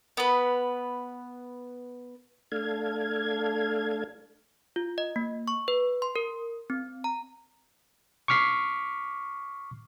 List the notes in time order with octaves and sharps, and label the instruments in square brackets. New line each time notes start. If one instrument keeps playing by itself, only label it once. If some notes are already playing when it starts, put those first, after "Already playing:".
[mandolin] B3 B4
[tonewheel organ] A3 D4 A4 F5 G#6
[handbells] F4
D#5
A#3
C#6
B4
C6
A#4
C4
A#5
[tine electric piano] C#6 D6 F6 B6 C7